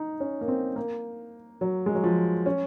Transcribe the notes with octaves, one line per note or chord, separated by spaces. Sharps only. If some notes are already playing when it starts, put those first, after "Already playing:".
Already playing: D#4
C#4
A#3
C4
A#3
F#3
G#3
F#3
F3
C#4